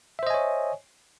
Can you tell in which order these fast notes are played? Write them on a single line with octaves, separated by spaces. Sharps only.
E5 C5 D#5 G#5 C#5